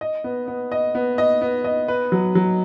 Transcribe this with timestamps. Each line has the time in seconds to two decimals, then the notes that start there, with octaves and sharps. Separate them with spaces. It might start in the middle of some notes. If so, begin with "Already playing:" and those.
0.01 D#5
0.24 B3
0.48 B3
0.72 D#5
0.95 B3
1.18 D#5
1.42 B3
1.64 D#5
1.88 B4
2.12 F#3
2.35 F#3